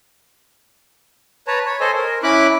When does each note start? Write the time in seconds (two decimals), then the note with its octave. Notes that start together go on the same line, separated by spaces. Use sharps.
1.47 B4 C#5 A5 A#5
1.65 C#5
1.80 A4 C5 D#5 G#5
1.96 A#4
2.23 C#4 E4 B5 D6 F#6